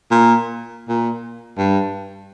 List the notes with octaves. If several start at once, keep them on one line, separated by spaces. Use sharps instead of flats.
A#2
A#2
G2